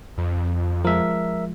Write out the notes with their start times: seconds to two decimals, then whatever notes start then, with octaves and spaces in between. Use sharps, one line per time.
0.18 F2
0.85 F3 G#3 A#4 E5